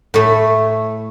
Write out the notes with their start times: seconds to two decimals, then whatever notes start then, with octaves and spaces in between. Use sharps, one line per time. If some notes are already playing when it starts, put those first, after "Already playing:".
0.14 A2 A3